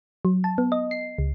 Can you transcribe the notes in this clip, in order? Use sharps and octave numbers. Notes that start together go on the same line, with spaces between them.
F#3
A5
B3
D#5
C7
C#2